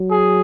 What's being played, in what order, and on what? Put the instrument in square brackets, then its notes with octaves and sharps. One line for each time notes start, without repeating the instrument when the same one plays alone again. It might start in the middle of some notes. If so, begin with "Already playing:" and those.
Already playing: [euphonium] F#3
[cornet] G#4